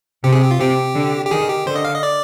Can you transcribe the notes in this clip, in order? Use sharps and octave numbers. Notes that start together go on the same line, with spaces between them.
C3 G4
G#4
G4
F4
C3 G4
D3
G4
D#3 G#4
G4
D3 C5
D#5
F5
D#5
D5